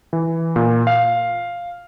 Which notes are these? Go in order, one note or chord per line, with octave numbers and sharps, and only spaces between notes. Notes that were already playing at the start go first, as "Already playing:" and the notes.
E3
A#2
F5